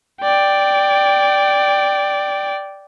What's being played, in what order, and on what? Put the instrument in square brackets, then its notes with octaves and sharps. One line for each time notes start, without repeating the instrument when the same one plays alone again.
[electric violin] D5 G5